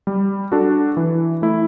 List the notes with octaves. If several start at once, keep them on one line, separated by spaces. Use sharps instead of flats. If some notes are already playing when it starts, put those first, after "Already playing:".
G3
D4 F#4 A4
E3
A3 E4